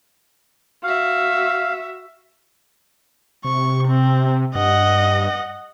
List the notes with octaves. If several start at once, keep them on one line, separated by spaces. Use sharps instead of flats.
F#4 E5 F5
C3 C#6
C4
G2 D#5 F#5